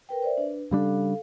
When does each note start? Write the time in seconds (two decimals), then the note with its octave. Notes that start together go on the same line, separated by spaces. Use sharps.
0.09 A#4 B4 G5
0.23 C5 D5 E5
0.37 D4 B4
0.71 C#3 G3 D4 A4 F5